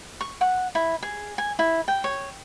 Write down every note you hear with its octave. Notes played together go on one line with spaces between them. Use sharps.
C#6
F#5
E4
G#4
G#5
E4
G5
C#5